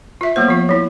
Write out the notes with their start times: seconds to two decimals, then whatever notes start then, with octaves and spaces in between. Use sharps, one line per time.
0.21 F4 E5
0.36 F#3 A#3 B3 C5
0.48 F3 F4
0.69 F#3 E4